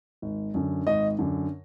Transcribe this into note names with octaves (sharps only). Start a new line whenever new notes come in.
G#1
F#2 D3
G#1 D#5
F#2 D3